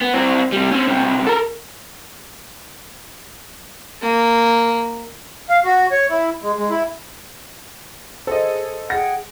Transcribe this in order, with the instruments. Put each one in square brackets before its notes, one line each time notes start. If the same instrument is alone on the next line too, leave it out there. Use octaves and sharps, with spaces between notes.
[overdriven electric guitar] B3
C4 E4
C3 G3
C4 C#4
B1 C3
A4 A#4
[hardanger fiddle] A#3
[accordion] F5
F#4
C#5
E4
G#3
G#3
E4
[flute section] G#4 [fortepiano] A4 D#5 [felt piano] C5
[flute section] G#4 F#5 G5 [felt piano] A#6